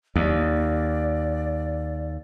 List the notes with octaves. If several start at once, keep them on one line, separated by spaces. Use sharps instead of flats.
D#2 D5